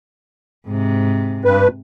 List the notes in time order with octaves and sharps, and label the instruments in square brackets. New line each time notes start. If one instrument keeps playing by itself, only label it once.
[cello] G#2 C3
[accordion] G2 B4